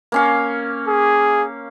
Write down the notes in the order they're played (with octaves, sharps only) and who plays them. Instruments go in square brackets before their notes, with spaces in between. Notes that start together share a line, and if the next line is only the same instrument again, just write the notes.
[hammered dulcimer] A#3 C#4 F5
[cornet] G#4